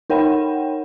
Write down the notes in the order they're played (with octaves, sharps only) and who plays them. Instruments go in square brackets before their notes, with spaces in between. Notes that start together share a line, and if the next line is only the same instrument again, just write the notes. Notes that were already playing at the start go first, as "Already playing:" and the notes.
[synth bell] D#4 A#4 C#5 F#5 G5 B5